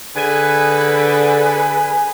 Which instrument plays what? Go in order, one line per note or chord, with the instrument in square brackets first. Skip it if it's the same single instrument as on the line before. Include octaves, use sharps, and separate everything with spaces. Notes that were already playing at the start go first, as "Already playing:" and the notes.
[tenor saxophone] D3 [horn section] G#4 B4 [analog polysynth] G#5